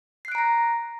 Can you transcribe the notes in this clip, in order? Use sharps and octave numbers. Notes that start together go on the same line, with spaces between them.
A#5 F#6 A#6 C7 D7